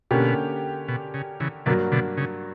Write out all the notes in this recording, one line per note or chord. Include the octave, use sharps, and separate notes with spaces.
B2 D3 A#3 C#4 G4
B2
C#3
C#3 E3
G2 B2 D3 F#3 A#3 D4 F#4
B2 D3
C#3